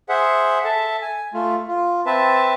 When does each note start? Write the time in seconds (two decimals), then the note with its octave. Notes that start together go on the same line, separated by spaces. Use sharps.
0.09 G#4 C5 E5 F#5
0.64 A4 E5 A5
1.02 G#5
1.34 A3 F4
1.68 F4
2.06 C4 B4 E5 A5